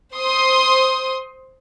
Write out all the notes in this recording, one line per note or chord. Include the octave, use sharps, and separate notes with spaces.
C5 C6 D#6